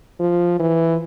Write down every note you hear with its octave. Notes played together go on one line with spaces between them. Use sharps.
F3
E3